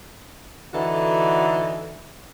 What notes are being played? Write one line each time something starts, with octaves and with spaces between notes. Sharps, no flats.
D3 E3 D#4 F#4 A4